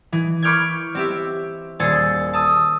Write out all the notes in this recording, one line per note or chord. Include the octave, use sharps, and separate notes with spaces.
E3
B5 C#6 D6 F6 G6 G#6
C4 G4 E5
D#1 G#4 C5 E6 A6 C#7
A5 D#6 E6